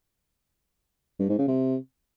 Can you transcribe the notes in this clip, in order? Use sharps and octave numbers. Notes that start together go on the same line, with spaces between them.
G2
G#2
C#3
C3